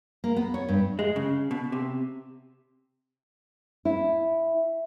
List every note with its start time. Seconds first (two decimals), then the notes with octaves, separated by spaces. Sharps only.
0.24 A#3
0.36 B3
0.54 C#5
0.69 G2
0.99 G#3
1.16 C#3
1.51 B2
1.72 C3
3.85 E4